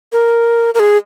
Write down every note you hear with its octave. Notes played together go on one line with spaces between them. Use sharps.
A#4
A#4
G#4